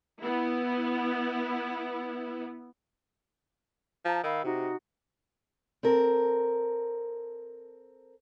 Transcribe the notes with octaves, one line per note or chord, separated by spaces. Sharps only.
B3 E4
F3 A5 A#5
D#3 F5 B5 E6
C3 D#4 F#4
C4 A4 A#4